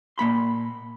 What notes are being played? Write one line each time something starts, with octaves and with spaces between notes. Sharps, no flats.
A#2 A#3 B5 C6